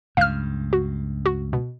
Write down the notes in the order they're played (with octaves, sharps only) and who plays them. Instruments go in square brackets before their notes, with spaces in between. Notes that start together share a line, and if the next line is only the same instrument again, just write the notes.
[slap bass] C#2 G2 [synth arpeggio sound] F5 F6
[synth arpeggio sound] F#4
F#4
B2